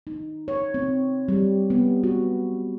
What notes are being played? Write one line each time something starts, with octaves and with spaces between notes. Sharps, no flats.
D#4
C#5
C4
G3
B3
F#4